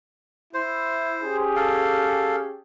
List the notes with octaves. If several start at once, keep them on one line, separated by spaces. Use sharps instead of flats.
E4 C5
C#4 G4 G#4
A4 F5